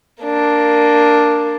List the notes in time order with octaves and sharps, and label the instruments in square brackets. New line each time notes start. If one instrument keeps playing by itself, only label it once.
[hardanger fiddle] A#3 D4